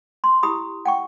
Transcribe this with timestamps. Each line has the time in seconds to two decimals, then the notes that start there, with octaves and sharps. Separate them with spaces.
0.24 C6
0.43 E4 G4 B5 D#6
0.85 F#5 G5 C#6